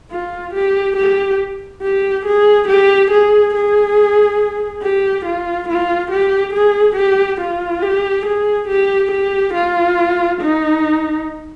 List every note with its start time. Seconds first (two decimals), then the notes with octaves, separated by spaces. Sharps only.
0.11 F4
0.54 G4
0.96 G4
1.82 G4
2.26 G#4
2.68 G4
3.11 G#4
3.54 G#4
4.83 G4
5.25 F4
5.69 F4
6.11 G4
6.54 G#4
6.96 G4
7.40 F4
7.82 G4
8.26 G#4
8.68 G4
9.11 G4
9.54 F4
10.40 D#4